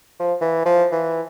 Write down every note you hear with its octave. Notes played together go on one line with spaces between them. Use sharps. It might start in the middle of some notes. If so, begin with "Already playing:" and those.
F3
E3
F3
E3